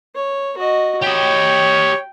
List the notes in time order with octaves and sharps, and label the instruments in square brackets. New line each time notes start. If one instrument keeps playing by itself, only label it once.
[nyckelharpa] C#5
F#4 D#5
[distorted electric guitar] G4 D#5 [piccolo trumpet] C#5 [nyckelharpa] G5